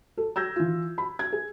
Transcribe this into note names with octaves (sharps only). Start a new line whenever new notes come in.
A4
E6 G6 G#6 A#6
E3 F4
B5
G#6
G#4